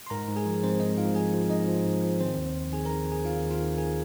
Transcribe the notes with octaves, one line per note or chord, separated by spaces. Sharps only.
C6
G#2 A#4 A#5
G#2
G#4 G#5
F3
G#2 C4 C5
G#2 D#4 D#5
G#2 F4 F5
F3 G#4 G#5
F3
G#2 D#4 D#5
F3
G#2
F3
D#3 C4 C5
D#2
D#2
D#3 G#4 G#5
D#3 A#4 A#5
D#2 G#4 G#5
D#3 F4 F5
D#2
F4 F5
D#3
D#3 G#4 G#5